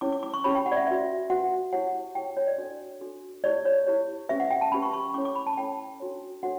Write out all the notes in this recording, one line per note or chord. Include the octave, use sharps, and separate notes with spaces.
C#4 E4 G4 C#5 D6
D6
D6
C#6
C#4 E4 G4 C#5 B5
G5
F#5
D5
E5
F#4 B4 E5
F#4 B4 F#5
E4 G4 C#5 F#5
E4 G4 C#5 G5
C#5
D5
D4 F#4 A4
D4 F#4 A4
E4 G4 C#5 D5
C#5
E4 G4 C#5
C#4 G4 B4 E5
F#5
G5
A5
C#4 G4 B4 B5
C#6
C#6
C#4 E4 A4 C#5 D6
D6
B5
A5
C#4 E4 A4 C#5 G5
D4 F#4 A4 C#5
D4 F#4 A4 C#5 F#5